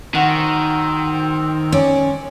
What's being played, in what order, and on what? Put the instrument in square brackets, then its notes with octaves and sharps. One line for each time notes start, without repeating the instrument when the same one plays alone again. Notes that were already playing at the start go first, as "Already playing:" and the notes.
[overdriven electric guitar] D#3 [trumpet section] C4 [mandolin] F#4 F#5 C#6
[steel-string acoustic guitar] C#4 [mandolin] D5